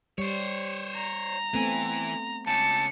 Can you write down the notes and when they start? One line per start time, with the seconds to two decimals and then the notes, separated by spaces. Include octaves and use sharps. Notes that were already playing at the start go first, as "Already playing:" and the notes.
0.18 G3 C5 C#5
0.95 A#5
1.53 E3 A3 B3 C4 G#5
2.47 C#3 G#3 A5 C#7